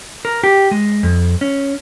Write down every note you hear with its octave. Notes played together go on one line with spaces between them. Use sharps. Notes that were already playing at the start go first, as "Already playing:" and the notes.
A#4
G4
G#3
F2
C#4